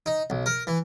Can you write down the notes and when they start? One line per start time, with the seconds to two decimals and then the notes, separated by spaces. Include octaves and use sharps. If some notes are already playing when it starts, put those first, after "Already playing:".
0.06 D#4
0.30 B1
0.46 A#4
0.67 E3